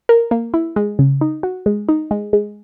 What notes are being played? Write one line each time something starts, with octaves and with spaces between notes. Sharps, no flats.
A#4
A#3
E4
G#3
C#3
D#4
F#4
G#3
D#4
G#3
G#3